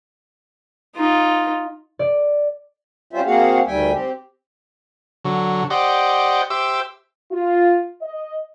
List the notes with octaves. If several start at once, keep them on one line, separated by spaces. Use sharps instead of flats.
D#4 F4
D5
G3 C4 C#4 F4 C5 E5
A#3 C4 F#4 G#4 F5 F#5
D2 D#3 G3 E5 G5 G#5
C4 G4
D3 F#3
G4 C5 D5 D#5 F#5
G4 C5 E5 D6 E6
F4
D#5